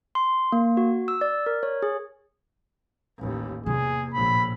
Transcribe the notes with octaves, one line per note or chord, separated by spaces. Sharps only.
C6
A#3
F#4
E6
D5
A#4
C#5
G#4
A1 D#2
E2 C3 A#3 G#4
A#1 A2 B5